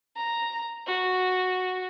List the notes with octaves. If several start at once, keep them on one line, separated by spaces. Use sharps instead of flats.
A#5
F#4